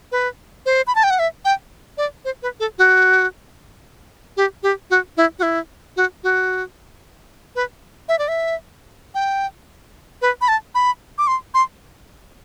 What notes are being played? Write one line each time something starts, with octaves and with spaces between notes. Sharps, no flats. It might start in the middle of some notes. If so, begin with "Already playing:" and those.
B4
C5
B5
A5
G5
F#5
E5
G5
D5
C5
B4
A4
F#4
G4
G4
F#4
E4
F#4
E4
F#4
F#4
B4
E5
D5
E5
G5
B4
B5
A5
B5
D6
C6
C6